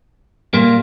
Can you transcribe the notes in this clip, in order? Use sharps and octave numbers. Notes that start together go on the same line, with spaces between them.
A#2 G3 A#3 F4